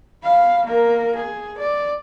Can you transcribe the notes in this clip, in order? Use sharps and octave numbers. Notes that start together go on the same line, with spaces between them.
F5 B5
A#3 A#4
G#4
D5